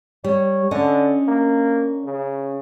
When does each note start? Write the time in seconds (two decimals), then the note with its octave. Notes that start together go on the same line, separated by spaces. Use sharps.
0.24 G3 C#5
0.71 D3 C#4 D4 D#5
1.28 A#3
2.04 C#3